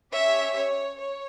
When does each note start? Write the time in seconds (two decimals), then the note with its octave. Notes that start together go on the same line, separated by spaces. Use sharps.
0.12 C#4 G4 C#5 E5
0.55 C#5
0.98 C#5